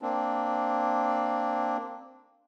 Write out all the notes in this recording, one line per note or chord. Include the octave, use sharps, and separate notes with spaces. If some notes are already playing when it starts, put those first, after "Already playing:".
A#3 C4 D4